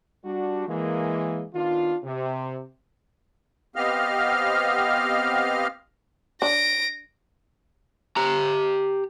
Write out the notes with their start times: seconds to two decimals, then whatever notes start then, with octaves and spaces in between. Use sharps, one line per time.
0.25 G3 D4 F#4
0.68 E3 G#3 A#3
1.54 D#3 B3 D4 F4
2.04 C3
3.76 B3 C4 G4 D#5 F5 F6
6.42 D4 A#6 D7
8.16 G4 A#5